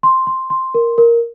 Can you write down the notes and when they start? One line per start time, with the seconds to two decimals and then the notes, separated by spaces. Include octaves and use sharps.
0.03 C6
0.27 C6
0.50 C6
0.74 A#4
0.98 A#4